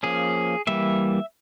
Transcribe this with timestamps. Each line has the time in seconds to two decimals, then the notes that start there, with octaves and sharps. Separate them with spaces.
0.03 F3 A#3 C#4 G#4
0.67 E3 G3 A#3 E5